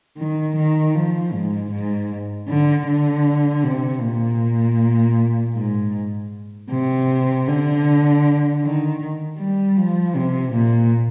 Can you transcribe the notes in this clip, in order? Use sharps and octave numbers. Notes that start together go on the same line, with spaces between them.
D#3
D#3
F3
G#2
G#2
D3
D3
C3
A#2
G#2
C3
D3
D#3
G3
F3
C3
A#2